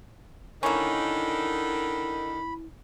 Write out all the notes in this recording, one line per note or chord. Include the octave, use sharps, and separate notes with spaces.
D3 D#3 A#3 C#4 E4 B5